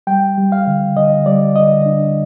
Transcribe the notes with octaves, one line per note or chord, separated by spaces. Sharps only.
G3 G5
G3
F5
D3
D3 D#5
G3 D5
D3 D#5
D4